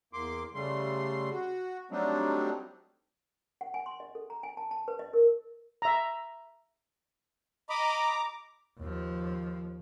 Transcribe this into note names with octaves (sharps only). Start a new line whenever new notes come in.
E2 A#3 C6 D6
C#3 G3 A3 C6
F#4
F#3 G3 A3 C4 D4 D#4
F#5
G#5
C6
D#5
A4
A#5
G#5
A5
A5
B4
D#5
A#4
E5 A#5
D#5 A#5 B5 D6
D#2 F3